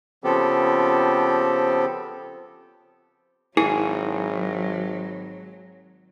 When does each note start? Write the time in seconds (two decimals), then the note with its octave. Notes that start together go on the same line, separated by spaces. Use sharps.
0.24 C#3 F3 B3 C4 G4 A4
3.57 G#1 F#3 E4 G#4